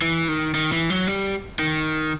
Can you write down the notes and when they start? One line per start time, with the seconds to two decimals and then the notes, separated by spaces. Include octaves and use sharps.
0.02 E3
0.28 D#3
0.54 D#3
0.72 E3
0.90 F#3
1.07 G3
1.59 D#3